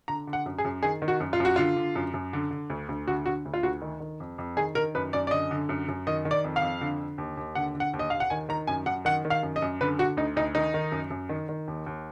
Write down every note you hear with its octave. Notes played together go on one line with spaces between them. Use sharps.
D3 A#5
D3
F#5
F#2
G#4
F#2
D#3 G#4
D#3
F#4
F#2
F4
F#2
F#4
D3 F4
D3
F#2
F#2
D3
D3
D2
D2
D3 F#4
D3 F#4
D2
F4
D2 F#4
D#3
D#3
F2
F2
D#3 G#4
D#3 A#4
F#2 B4
F#2 D5
D5
D3 D#5
D3
F#2
F#2
D#3 D#5
D#3
D5
F2
F5
F2
D3
D3
D#2
D#2
D3 F#5
D3
F#5
D#2
D#5
D#2 F5
F#5
D#3 G#5
D#3 A#5
F#2 G#5
F#2 F#5
D#3 F#5
D#3
F5
F#2
D#5
F#2
D3 B4
D3 F#4
D2 D#4
D2 D#4
D#3 D#4
D#3
F#2
F#2
D#3
D#3
D#2
D#2